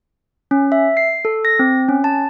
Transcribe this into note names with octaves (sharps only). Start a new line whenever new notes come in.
C#4
E5
C7
A4
A#6
C4
C#4
A5